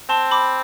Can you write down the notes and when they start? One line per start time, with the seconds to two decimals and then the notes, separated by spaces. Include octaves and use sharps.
0.09 C4 A5 C6
0.31 B5 D6